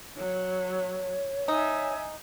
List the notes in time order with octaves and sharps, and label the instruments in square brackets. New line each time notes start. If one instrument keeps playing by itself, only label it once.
[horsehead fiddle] F#3 [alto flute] C#5
[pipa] D#4 [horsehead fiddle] E5 G#5